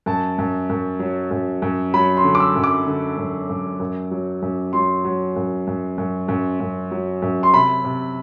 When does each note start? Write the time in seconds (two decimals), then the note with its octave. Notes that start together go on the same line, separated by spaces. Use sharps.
0.06 F#2 A5
0.38 F#2
0.70 F#2
0.99 F#3
1.31 F#2
1.62 F#2
1.93 F#3 B5
2.17 C6
2.24 D3
2.35 D6
2.40 E6
2.56 F#2
2.64 D6
2.87 D3
3.17 F#2
3.49 F#2
3.80 F#2
4.11 F#3
4.42 F#2
4.73 F#3 C6
5.05 F#3
5.36 F#2
5.67 F#2
5.98 F#2
6.28 F#2
6.60 F#2
6.91 F#3
7.22 F#2
7.43 C6
7.53 C3 B5
7.84 C3